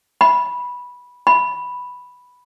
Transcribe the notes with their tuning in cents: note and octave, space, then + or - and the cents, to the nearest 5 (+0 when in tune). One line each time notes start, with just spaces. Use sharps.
B5 -10
B5 +0